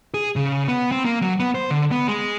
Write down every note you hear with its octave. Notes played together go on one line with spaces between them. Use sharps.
G#4
C#3
B3
C4
A#3
F#3
B3
C5
D3
B3
G#3